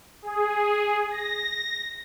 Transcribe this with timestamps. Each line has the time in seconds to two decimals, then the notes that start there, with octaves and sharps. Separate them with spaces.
0.22 G#4
1.10 A#6